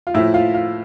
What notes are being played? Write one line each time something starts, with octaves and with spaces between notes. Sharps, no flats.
F4
A2 F3 E4
F4
F4